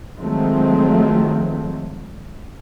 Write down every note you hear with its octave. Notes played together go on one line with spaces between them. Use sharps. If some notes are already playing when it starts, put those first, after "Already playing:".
D#3 F3 F#3 G#3 A3 C4